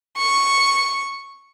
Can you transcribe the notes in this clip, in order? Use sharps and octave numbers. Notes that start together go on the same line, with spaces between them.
C#6